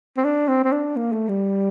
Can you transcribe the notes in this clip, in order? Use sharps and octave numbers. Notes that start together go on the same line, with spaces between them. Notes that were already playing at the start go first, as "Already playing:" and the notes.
C4
D4
C4
C4
D4
A#3
A3
G3